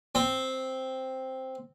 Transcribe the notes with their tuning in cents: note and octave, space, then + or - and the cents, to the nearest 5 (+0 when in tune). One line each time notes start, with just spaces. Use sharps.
C4 +0